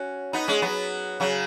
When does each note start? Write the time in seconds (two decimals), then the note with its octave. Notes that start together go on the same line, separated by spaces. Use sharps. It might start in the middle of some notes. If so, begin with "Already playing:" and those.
Already playing: C#4 F#4
0.33 B3 D#4
0.48 G#3 C#4
0.62 F#3 B3
1.20 C#3 F#3